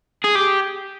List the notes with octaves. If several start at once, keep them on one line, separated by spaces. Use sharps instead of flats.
G#4
G4